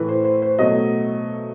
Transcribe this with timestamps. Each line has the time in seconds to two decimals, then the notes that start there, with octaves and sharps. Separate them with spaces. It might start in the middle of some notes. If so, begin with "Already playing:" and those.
Already playing: A2 E3 A3 B4
0.09 C5
0.24 C5
0.42 C5
0.59 B2 F#3 A3 D#5